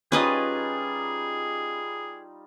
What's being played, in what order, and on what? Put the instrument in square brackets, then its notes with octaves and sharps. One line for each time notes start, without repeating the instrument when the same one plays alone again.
[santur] G3 D#4 F4 [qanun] C#4 B4 D#5 [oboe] G#4